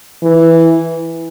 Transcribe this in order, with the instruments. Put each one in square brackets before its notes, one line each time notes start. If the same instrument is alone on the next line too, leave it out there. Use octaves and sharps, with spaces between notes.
[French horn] E3